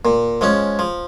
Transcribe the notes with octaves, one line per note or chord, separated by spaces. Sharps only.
A#2
F3 G#3 C#4
F3